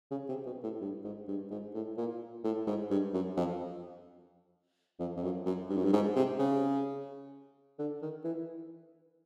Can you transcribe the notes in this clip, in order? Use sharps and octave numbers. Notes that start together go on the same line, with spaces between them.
C#3
C3
B2
A2
G2
G#2
G2
G#2
A2
A#2
A2
G#2
G2
F#2
F2
F2
F2
F#2
F#2
G2
F#2
G2
G#2
C3
C#3
D3
D#3
E3